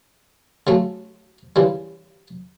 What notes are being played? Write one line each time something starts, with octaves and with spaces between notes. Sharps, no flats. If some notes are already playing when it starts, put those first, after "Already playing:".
C#3 F#3 A3
C#3 E3 G3